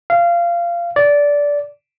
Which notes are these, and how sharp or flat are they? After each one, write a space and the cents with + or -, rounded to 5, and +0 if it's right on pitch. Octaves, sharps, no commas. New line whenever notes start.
F5 -20
D5 -15